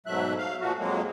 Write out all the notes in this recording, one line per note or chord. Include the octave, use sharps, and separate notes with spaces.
G#2 B2 F#3 A3 E5 F#6
F5
A#2 F3 A3 F#4
F2 F#3 G#3 A#3